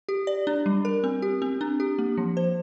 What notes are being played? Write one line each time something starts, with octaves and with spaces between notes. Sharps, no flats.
G4
D5
D4
G3
A#4
C4
G4
C4
D4
G4
A#3
F3
C5